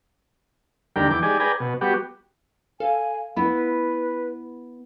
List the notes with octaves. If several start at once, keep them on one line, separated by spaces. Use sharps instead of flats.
D#2 D3 G3 A#4 G5
E2 G5 D6
G#3 D#4 G4 D5 G#5
G#4 B4 D5 G5 G#5 A#5
B2
G3 B3 F#4 G4
A4 F5 G#5
B3 E4 B4 B5